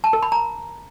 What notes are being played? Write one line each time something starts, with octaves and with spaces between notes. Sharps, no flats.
A5
A#4
B5
A#5